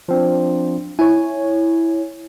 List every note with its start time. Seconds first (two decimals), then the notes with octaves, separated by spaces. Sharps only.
0.08 F3 C4 D4
0.99 E4 C#5 G#5